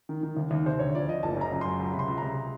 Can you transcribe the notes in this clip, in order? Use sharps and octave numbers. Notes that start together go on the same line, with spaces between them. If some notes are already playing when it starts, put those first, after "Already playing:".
D#3
D#3
D#2
D#2
C3 C5
D2 C#5
F3 D5
F3 D#5
F#1 A5
F#2 A#5
C#3
F#2 C6
C#2
C3 B5
C6
C#2
C3 A#5